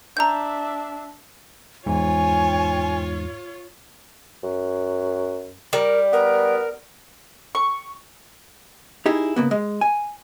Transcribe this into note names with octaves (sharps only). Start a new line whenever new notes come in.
D4 E5 A#5 G6
E2 G#2 F4 C#5 G#5
F#2
G3 A#4
B3 A#4
C#6
D#4 E4 G4 G#4
C#3 A#3 B3
G#3
G#5